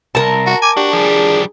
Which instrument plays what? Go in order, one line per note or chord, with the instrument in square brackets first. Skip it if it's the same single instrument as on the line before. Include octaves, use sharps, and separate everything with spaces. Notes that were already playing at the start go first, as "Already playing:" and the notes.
[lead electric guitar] C2 [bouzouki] A#4 A5
[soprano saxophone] F#4
[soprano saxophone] G#5 [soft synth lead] D6
[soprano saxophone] D4 [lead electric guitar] F#4 [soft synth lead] G4
[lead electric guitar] F3 G3 [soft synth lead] G#4